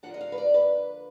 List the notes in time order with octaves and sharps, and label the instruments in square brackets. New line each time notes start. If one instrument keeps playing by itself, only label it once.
[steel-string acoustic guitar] D3 F3 A#3 D4 F#5
D#5
F5
B4
D5
B4